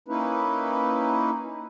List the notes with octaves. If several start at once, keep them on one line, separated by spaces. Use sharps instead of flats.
A#3 C#4 D#4 E4 B4